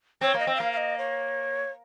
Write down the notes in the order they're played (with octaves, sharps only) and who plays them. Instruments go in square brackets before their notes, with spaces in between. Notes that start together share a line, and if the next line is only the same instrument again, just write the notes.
[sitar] C4 [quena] C#5
[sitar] A#3 [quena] D#5
[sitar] C4
[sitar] A#3 [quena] F5
[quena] F5
D#5
C#5